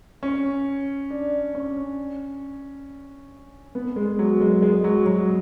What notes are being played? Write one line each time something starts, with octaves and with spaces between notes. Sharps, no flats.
C#4
D4
C#4
B3
G#3
F#3
G#3
G#3
F#3
F#3